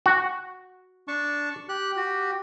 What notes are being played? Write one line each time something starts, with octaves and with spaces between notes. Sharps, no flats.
F#4
D4 A5 C#6
G4 F#6
F#4 G4